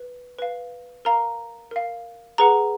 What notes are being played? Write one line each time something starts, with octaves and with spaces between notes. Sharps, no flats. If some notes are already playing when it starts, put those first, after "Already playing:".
Already playing: B4
B4 F5
A#4 F5 A#5
A#4 F5
G#4 B4 F#5 A#5